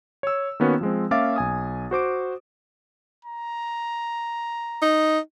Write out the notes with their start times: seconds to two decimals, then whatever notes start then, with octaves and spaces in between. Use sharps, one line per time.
0.23 C#5 E6
0.60 D#3 A#3 B3 C#4 F#4
0.81 F3 G#3 C4
1.11 A#3 C#4 E5 F5 D6 A6
1.36 B1 G#5 D#6
1.91 F#4 C5 D6 D7
3.25 A#5
4.82 D#4